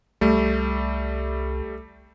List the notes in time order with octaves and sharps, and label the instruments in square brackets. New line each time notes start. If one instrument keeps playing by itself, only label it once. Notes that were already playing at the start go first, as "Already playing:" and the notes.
[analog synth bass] C2 [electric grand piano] G3 A3